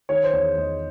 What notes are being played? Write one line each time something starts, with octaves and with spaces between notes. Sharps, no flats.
D#3 C#5
C5
E2 C#5
E2 D#5